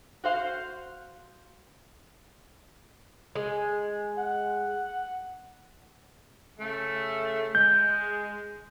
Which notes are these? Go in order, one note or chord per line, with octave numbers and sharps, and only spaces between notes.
F#4 C5 F5
G#3
F#5
C#3 A3
G#3 G6